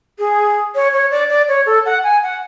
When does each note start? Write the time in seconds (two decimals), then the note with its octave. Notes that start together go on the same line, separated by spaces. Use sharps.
0.19 G#4
0.75 C#5
0.93 C#5
1.11 D5
1.29 D5
1.49 C#5
1.66 A4
1.86 F#5
2.03 G#5
2.23 F#5